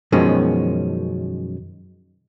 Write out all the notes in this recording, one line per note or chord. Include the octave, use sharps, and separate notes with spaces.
F#2 B2 D#3 F3 G#3 C#4